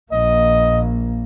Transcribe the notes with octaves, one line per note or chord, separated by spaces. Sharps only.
A#1 A#3 D#5